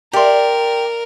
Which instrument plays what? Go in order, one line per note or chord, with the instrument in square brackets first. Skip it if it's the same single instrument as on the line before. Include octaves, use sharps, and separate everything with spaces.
[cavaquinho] G4 C6 [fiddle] A#4 [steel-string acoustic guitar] D5 F5